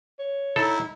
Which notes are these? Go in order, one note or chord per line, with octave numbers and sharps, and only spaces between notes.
C#5
D#4 E4 A4